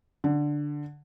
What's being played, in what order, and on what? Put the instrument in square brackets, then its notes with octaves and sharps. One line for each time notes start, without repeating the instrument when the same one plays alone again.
[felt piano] D3